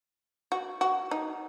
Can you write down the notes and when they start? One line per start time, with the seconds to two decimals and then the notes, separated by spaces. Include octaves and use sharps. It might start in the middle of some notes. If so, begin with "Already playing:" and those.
0.52 F#4
0.81 F#4
1.11 D#4